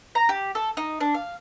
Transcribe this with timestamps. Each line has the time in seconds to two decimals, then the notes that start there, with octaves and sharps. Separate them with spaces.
0.15 A#5
0.29 G4
0.55 A4
0.77 D#4
1.00 D4
1.14 F5